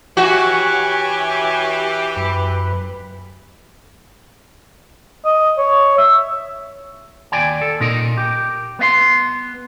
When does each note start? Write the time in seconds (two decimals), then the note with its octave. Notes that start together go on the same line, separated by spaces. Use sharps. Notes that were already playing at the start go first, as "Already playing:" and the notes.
0.17 E3 F#4 G4 C#5 G#5
2.17 F#2 B4
5.25 D#5
5.58 C#5
5.98 E5
7.32 D#2 D5 G5 G#5
7.61 A4
7.80 A#2 D#4 A#4
8.17 G4
8.79 B3 E5 C6